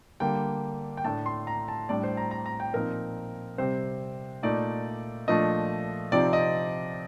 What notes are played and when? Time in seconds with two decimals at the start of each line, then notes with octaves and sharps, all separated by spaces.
0.20 D3 G3 A#3 G5
0.97 G5
1.04 A2 A3 D4 A5
1.26 C6
1.47 A#5
1.68 A5
1.89 A2 G3 D4 D5
2.03 C5
2.17 A#5
2.31 A#5
2.46 A#5
2.60 G5
2.74 A#2 F3 C4 D#4 A#4
3.58 C3 G3 C4 C5
4.43 A#2 A3 D#4 D5
5.27 A#2 F3 A3 D4 D#5
6.12 C3 F3 C4 D#4 D5
6.33 D#5